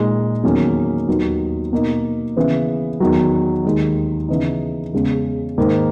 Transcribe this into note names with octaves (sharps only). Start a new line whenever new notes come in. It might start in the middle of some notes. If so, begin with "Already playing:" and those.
Already playing: A#2 G#3 D#4
E2 D#3 F#3 A#3 C#4
D#2 D#3 F#3 B3
B2 A#3 D#4
C#3 E3 B3
E2 D#3 F#3
D#2 D#3 G#3
C#3 E3 B3 D#4
E2 C#3 G#3
G#2 D#3 A#3